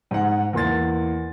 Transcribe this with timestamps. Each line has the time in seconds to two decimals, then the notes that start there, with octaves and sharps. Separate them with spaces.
0.11 G#2 F#5
0.53 E2 A#3 C6 A6